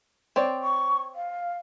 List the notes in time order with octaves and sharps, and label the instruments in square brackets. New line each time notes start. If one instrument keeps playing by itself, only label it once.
[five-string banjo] C4 C#5 D5
[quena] C#6
F5